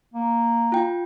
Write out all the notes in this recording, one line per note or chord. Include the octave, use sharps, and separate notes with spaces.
A#3
F4 G5